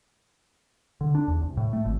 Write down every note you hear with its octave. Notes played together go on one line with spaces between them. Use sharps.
D3
D4
E2
C2
A2
A3
G#1